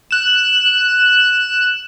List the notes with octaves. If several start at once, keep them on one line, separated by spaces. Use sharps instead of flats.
F#6 E7